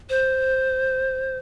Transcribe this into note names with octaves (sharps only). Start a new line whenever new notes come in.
C5